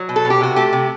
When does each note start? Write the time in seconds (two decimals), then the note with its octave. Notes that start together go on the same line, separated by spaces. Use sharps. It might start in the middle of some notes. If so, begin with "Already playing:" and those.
Already playing: F#3
0.09 B2
0.16 A4
0.25 B2
0.30 G4
0.40 C3 F#4
0.56 A3 G4
0.73 C3